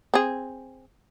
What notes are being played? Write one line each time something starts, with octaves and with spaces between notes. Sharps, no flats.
C4 G#4